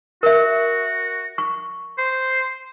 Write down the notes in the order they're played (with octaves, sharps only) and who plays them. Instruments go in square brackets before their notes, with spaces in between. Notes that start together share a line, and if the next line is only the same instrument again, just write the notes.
[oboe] F#4 [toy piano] A#4 E5
[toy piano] C#6
[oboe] C5